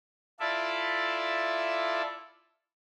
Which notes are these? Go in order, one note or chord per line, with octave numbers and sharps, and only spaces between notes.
E4 F4 A4 D5 E5